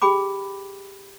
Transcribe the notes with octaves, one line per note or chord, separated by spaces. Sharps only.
G4 G#4 G5 B5 D6